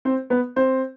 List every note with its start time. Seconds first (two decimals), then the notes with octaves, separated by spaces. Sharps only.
0.05 C4 C5
0.30 B3 B4
0.56 C4 C5